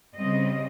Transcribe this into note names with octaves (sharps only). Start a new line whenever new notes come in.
C#3 G3 C4 D#5